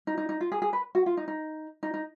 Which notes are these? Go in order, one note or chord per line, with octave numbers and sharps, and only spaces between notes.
D#4
D#4
D#4
F4
G#4
G#4
B4
F#4
F4
D#4
D#4
D#4
D#4